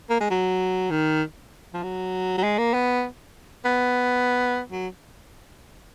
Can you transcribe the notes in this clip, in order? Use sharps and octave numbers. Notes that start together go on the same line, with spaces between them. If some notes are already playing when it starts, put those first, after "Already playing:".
A#3
G#3
F#3
D#3
F3
F#3
F#3
G#3
A#3
B3
B3
F#3